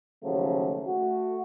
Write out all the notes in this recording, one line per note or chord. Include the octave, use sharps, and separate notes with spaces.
A1 D#2 C#3 F3 F#3 A3
A3 F#4